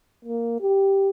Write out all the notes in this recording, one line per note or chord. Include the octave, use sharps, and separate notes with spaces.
A#3
G4